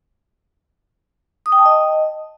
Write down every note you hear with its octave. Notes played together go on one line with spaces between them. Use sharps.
D#6
G5
A5
D#5